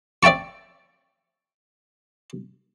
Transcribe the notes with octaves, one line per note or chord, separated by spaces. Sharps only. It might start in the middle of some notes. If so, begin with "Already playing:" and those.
D5 E5 G5 A5 C#6